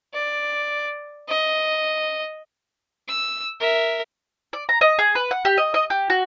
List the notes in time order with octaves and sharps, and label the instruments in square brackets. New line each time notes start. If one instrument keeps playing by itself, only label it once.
[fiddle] D5
D#5
E6
A#4 E5
[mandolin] D5
A#5
D#5
G#4
B4
F#5
G4
D#5
D#5
G4
F#4